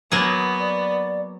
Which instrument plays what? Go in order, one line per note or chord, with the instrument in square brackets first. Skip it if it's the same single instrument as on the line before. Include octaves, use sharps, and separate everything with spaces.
[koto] F#3 A#3 G#4 [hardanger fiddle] B3
[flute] D5